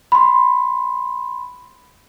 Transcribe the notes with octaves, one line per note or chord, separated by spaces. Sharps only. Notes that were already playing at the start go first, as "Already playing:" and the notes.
B5 C6